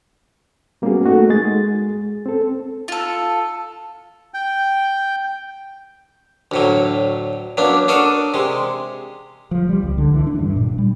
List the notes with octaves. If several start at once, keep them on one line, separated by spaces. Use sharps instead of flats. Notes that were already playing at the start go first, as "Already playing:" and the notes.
G3 A#3 B3 C#4 F#4 G#4
A3 D#4 F#4 A4
G#3 G#4 A6
C4 A4
F4 A4
G5
D2 A2 F#3
F#3 A#3 B3 D4
D4 F#4 A4 A#4 D#5
C3 G#3
F3
G3
C#2
D3
E3
D4
G2
A#2
G3